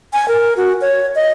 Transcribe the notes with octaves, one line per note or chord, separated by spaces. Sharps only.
G#5
A#4
F#4
C#5
D#5